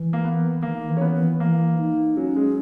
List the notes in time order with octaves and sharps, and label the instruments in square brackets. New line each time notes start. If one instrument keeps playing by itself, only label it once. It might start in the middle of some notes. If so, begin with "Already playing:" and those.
Already playing: [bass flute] E3
[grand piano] A#3
B3
[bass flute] D#3 [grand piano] A#3
[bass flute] E3
[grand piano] C#4
B3
[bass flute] E3
[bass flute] E3 [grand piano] A#3
[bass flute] D#4
[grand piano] F#3 [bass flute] C#4
[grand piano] G#3